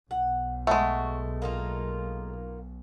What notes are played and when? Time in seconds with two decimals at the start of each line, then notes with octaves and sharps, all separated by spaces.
0.11 B1 F#5
0.67 G#3 A3 F#4
1.42 A#3 D#4 F4